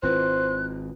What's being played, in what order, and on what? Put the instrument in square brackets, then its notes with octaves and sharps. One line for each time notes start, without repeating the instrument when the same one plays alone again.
[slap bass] G#1 C4 [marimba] E4 F4 B4 [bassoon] C5 [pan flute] F#6